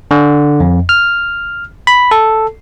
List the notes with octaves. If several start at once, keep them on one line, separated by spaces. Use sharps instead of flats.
D3
F2
F6
B5
A4